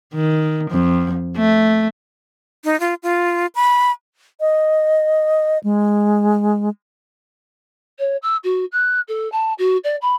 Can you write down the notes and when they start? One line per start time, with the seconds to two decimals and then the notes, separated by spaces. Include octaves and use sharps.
0.14 D#3
0.71 F2
1.37 A3
2.65 D#4
2.80 F4
3.03 F4
3.55 B5
4.40 D#5
5.64 G#3
7.99 C#5
8.23 E6
8.44 F#4
8.72 F#6
9.08 A4
9.32 A5
9.59 F#4
9.84 D5
10.02 B5